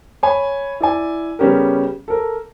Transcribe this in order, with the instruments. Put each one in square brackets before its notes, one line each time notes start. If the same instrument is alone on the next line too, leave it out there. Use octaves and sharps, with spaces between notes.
[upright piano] C#5 G#5 B5
E4 D5 G#5
C#3 G3 B3 C#4 G4 A#4
A4 A#4